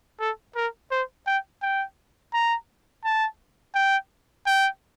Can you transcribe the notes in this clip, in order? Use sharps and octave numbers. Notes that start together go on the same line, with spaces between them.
A4
A#4
C5
G5
G5
A#5
A5
G5
G5